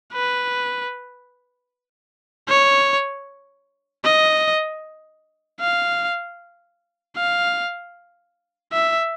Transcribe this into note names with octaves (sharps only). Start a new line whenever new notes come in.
B4
C#5
D#5
F5
F5
E5